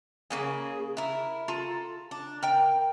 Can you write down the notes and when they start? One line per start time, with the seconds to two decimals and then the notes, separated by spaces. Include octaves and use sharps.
0.30 C#3 A#3 G#4
0.97 E4 A#4
1.48 F4 A4 A#5
2.11 D4
2.43 A#4 G5